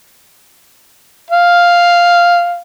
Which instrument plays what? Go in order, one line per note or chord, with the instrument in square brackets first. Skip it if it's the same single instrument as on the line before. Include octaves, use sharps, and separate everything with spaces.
[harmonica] F5